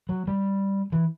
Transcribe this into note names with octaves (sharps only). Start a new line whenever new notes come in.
F#3
G3
E3